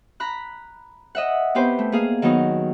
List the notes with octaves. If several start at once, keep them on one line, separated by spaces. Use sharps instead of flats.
A#5 B5 F#6
D#5 E5 F#5
B3 C4 G4 B4 C5
A3
A#3 G#4 F5
D#3 F#3 B3 D#4